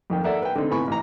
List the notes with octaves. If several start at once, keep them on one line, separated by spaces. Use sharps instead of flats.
F2 D#3 G5
A4 A#4 D5 E5 F#5 A#5
B4 G5
D3 C4 D#4
A2 C3 B3 G#5 B5 C#6
A1 A#5